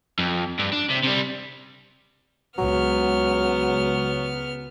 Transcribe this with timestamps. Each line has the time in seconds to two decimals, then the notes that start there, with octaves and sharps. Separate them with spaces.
0.19 F2
0.59 G2
0.73 D4
0.90 C3
1.04 C3 G3
2.58 C#2 F#3 B3 F6